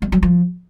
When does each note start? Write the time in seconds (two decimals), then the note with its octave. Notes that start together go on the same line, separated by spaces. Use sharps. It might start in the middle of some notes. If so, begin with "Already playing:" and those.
0.02 G#3
0.12 F#3
0.23 F3